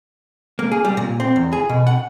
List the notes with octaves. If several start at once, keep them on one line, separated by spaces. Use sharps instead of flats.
A#3
G#4
G3
A#2
C4
E2
G#4
B2
F#5